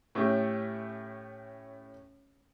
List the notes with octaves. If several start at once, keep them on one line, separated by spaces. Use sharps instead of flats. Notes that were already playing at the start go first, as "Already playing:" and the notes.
A2 A3 C#4 G4